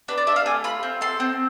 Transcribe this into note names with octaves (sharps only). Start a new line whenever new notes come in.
D4 B4
D5
D4 E5
F5
A3 G#5
F4 B5
C4
A4 C6
C4